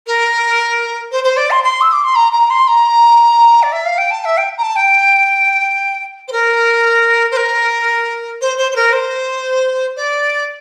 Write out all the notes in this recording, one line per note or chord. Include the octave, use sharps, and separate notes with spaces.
A#4
C5
C5
D5
C6
C6
E6
D6
C6
A#5
A#5
C6
A#5
D5
E5
F5
G5
A5
E5
G5
A#5
A5
G5
C5
A#4
C5
A#4
C5
C5
C5
A#4
C5
D5